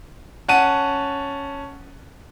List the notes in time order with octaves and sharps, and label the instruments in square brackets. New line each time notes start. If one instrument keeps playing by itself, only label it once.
[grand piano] C#4 F#5 A5 D#7